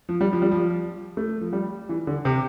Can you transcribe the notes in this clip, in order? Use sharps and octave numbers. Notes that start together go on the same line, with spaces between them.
F3
G3
F3
G3
F3
A3
F3
G3
E3
D3
C3